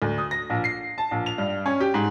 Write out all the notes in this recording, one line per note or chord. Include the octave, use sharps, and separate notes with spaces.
D2
D#6
A#6
A#1
C7
A5
A#1
F7
G2
C#4
G4
G#2